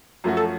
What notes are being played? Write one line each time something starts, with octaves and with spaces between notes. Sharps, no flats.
F#2 F3 A3 C#4 F#4
A4